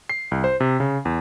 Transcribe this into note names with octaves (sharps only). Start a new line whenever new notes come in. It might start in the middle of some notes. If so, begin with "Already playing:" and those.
C7
C2
C5
C3
C#3
E2